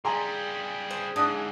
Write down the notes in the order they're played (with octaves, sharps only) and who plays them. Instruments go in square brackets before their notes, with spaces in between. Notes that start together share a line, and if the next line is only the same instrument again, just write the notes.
[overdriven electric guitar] C#3 G3 [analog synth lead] G#4 [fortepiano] G#5 A#5 C6
[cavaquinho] C5
[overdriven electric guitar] G#2 E3 [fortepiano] D4 F#6 [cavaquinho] D#6